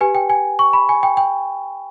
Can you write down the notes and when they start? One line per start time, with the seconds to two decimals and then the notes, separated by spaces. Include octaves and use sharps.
0.01 G4 B4 G#5
0.15 G5
0.30 G#5
0.59 C#6
0.73 B5
0.89 G#5
1.03 G5
1.17 G5